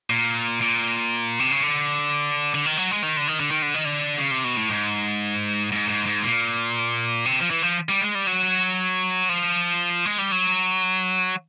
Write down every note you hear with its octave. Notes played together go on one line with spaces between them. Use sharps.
A#2
A#2
C3
C#3
D3
D3
D#3
F#3
G#3
D#3
D3
D#3
D3
D#3
D3
D#3
D3
C#3
C3
B2
A2
G#2
G#2
G#2
G#2
A#2
C3
F3
E3
F3
G3
G#3
G3
F#3
F3
G#3
G3
F#3